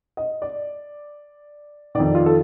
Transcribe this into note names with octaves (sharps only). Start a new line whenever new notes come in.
D#5
D5
F2 D#3 D5
F4
A4